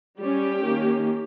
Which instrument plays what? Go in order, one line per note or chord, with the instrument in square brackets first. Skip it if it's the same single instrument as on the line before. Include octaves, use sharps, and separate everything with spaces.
[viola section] G3 C#4 G4
D#3 A#3 C#4